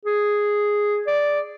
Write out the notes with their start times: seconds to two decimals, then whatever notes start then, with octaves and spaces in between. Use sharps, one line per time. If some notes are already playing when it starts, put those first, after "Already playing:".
0.05 G#4
1.07 D5